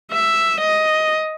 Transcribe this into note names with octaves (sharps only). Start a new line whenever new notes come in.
E5
D#5